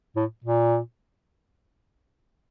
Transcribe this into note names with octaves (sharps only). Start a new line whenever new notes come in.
A2
A#2